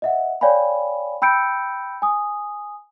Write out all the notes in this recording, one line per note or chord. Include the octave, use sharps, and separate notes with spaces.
D#5 E5 F#5
C#5 D5 F5 G5 G#5 B5
G5 B5 E6 G6 C#7 D7
G#5 D#6